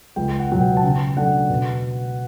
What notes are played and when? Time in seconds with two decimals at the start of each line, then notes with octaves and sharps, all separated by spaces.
0.16 C#2 G5
0.39 F#5
0.50 B2 F#3 B3 F#5
0.61 G5
0.77 A5
0.83 C#3 G5
1.16 F#3 A3 D4 F#5
1.50 B2